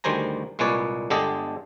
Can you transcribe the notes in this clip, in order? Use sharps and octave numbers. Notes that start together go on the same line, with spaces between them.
D2 D#3 G3 C5 G#5 A#5
C2 A#2 G#3 B4 C#5 D5
G1 D3 G#3 G4 A4 D#5